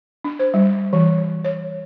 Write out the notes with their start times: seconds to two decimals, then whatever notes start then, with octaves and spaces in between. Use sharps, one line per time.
0.24 D4
0.39 C5
0.54 G3
0.93 E3
1.44 C#5